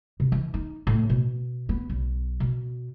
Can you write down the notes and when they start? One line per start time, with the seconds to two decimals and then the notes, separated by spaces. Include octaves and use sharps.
0.20 C3
0.32 E3
0.54 D#4
0.87 A2
1.10 B2
1.69 B3
1.89 B1
2.40 B2